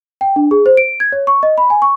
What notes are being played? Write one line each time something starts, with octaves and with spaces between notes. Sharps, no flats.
G5
D4
G#4
C5
D7
G#6
C#5
C#6
D#5
B5
G#5
C#6